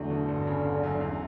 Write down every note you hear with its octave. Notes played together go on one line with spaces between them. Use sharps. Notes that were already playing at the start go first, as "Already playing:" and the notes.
Already playing: E2 D3 F#3 A3
B2
G1
C#3
G1
F#2
E2